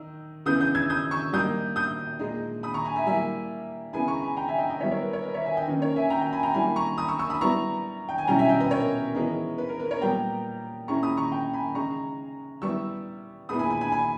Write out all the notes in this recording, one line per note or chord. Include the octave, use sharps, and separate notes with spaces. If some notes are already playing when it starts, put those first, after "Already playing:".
Already playing: D#3 D#4 E6
C#3 E3 G#3 B3 D#6 G6
D#6 G6
E6 G#6
D#6 G6
C#6 E6
G3 A#3 D#4 D#6 G6
D#6 G6
A#2 G#3 D#4
B5 D#6
A#5 C#6
G#5 B5
E5 G#5
G3 A#3 E4 E5 G#5
C#3 G#3 B3 E4 G#5 B5
A#5 C#6
G#5 B5
G5 A#5
E5 G#5
D#5 G5
D#5 G5
G3 B3 E4 C#5 E5
A#4 C#5
B4
A#4 C#5
B4 D#5
C#5 E5
E5 G#5
D#5 G5
D#3 A#3 C#4 B4
A#4 C#5
E5 G#5
G5 A#5
G5 A#5
G#5 B5
G5 A#5
G3 A#3 E4 G#5 B5
A#5 C#6
B5 D#6
C#6 E6
C#6 E6
B5 D#6
G3 B3 E4 A#5 C#6
G5
G#5
B2 G3 C#4 E4 G5 A#5
E5 G#5
D#5 G5
B4 D#5
A#4 C#5
E3 G#3 B3 D#4
B4
A#4
B4
A#4 C#5
A#2 G3 B3 G5 A#5
A#2 G#3 C#4 E4 A#5 C#6
B5 D#6
A#5 C#6
G5 A#5
G#5 B5
C#3 G#3 D#4 A#5 C#6
G3 B3 E4 C#6 E6
A#2 G#3 B3 E4 B5 D#6
G#5 B5
G#5 B5
G#5 B5
G#5 B5